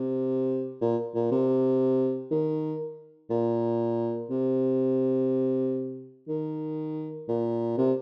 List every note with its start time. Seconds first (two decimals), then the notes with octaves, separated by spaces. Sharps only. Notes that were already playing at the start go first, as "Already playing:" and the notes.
Already playing: C3
0.81 A#2
1.15 A#2
1.32 C3
2.31 D#3
3.30 A#2
4.30 C3
6.28 D#3
7.28 A#2
7.78 C3